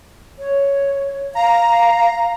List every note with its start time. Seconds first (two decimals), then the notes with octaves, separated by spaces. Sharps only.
0.39 C#5
1.35 F5 A#5